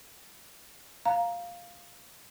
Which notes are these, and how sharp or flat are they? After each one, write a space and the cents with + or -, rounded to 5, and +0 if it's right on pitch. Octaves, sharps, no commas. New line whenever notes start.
F5 +0 A#5 +0